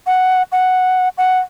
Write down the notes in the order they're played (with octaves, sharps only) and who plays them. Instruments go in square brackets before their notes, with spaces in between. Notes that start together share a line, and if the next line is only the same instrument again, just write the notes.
[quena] F#5
F#5
F#5